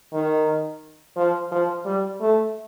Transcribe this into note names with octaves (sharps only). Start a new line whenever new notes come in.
D#3
F3
F3
G3
A3